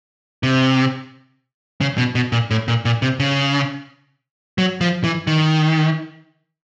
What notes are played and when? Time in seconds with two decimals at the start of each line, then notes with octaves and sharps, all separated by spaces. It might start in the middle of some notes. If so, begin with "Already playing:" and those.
0.43 C3
1.81 C#3
1.98 B2
2.15 B2
2.32 A#2
2.51 A2
2.68 A#2
2.85 A#2
3.02 C3
3.20 C#3
4.58 F#3
4.81 F3
5.04 E3
5.27 D#3